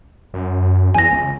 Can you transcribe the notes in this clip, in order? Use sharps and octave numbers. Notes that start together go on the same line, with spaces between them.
F#2
F#2
E2 G#5 A#6
C#2